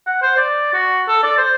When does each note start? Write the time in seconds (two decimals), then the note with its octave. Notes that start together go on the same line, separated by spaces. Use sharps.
0.07 F#5
0.22 C5
0.37 D5
0.74 F#4
1.08 A4
1.23 D5
1.38 C5